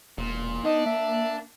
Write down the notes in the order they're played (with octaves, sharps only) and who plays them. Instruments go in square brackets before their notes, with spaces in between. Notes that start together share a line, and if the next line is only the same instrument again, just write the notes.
[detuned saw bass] E1 [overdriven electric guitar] A#2
[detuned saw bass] B3 [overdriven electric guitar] D4 [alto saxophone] D#4
[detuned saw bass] A#3 [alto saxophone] E5